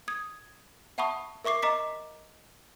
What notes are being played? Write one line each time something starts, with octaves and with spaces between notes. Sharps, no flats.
D#6 G#6
E5 F#5 A5 B5 C#6 D#6
A#4 E5 C#6 D6 C7
D#5 A#5 D6 B6